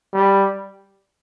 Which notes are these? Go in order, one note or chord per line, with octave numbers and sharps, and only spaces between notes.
G3